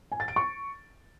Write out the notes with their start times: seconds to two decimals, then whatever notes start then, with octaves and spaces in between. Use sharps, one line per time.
0.12 G#5
0.20 A6
0.28 D7
0.36 C#6